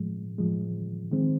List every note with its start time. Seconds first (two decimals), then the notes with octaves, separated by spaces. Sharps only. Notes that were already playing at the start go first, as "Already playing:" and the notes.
Already playing: A2 F3 G#3
0.38 A2 F3 G#3
1.11 D#3 G#3 C4